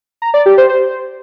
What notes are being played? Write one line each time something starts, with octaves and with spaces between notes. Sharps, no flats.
A#5
D5
G4
C5
C5